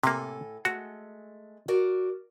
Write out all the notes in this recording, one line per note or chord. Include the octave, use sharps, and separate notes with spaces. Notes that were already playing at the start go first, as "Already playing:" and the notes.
A2 C3 A#3 A4 G#5
G#3 A3 F#4
F#4 A#4 D5